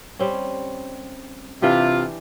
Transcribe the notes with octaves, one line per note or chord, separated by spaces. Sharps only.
G3 C4 C#4
C3 E3 D4 F4 G4